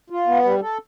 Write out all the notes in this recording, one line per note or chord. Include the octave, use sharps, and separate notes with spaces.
F4
B3
G3
A4